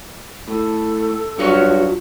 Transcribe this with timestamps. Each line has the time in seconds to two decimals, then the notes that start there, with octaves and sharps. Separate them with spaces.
0.48 A2 A4
1.39 G2 F3 F#3 C#4 F#4 C#5